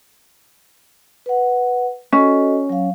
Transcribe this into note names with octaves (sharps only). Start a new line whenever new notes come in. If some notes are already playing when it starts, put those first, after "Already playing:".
B4 F#5
C#4 F#4 A4 D#5
F#3 F5